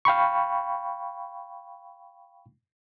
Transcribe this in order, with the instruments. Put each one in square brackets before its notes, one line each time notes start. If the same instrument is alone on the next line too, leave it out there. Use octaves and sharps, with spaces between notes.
[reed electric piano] F5 G5 B5 C#6